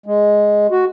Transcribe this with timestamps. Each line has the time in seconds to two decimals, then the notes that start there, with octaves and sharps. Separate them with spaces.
0.06 G#3
0.71 F#4